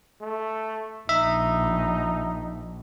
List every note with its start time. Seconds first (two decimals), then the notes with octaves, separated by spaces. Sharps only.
0.21 A3
1.09 A#1 D#4 E5